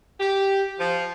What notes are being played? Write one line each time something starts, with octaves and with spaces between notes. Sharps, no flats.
G4
F3